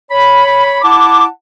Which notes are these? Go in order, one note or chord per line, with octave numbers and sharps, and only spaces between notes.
C#5 B5
E4 F#5 A5 D6